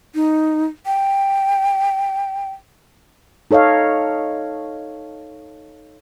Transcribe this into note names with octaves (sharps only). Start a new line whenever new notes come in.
D#4
G5
D#4 A4 C#5 D#5 F5